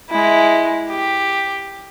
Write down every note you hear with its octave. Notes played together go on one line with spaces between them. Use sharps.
G#3 E4
G4